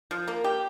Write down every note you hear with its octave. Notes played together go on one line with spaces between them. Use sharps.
F3
A#3
G4